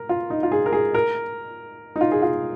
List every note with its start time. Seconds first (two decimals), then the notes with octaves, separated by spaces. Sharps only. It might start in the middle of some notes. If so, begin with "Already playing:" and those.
Already playing: A#4
0.09 F4
0.30 D#4
0.43 F4
0.52 G#4
0.66 A#4
0.73 G#4
0.94 A#4
1.96 D#4
2.01 F4
2.12 G#4
2.22 F4